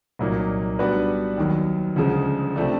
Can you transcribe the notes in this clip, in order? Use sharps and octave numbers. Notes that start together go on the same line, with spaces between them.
C2 A#2 F#3 A#3 D#4
G3 B3 D4 F#4 B4
D#2 D#3 F#3
D2 C#3 F3 G#3
C3 F3 A3 D4